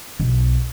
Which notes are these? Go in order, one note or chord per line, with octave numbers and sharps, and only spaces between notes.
B1